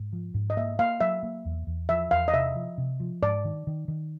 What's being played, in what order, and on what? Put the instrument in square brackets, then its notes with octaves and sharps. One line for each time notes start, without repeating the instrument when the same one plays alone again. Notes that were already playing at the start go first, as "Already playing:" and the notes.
Already playing: [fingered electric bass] G#2
F3
G#2
[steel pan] D#5
[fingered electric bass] A#3 [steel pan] E5
[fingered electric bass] A#3 [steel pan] F5
[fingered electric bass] F#3 [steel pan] E5
[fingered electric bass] A#3
E2
E2
[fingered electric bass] F3 [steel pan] E5
[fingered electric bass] E2 [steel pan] F5
[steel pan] D#5
[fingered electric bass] C3 [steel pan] E5
[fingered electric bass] F3
C3
F3
[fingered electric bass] G#2 [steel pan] D5
[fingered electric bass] D#3
D#3
D#3